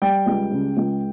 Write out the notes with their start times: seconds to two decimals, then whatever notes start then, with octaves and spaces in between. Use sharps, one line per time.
0.02 G3 G5
0.26 C#2
0.52 C#3
0.77 C#2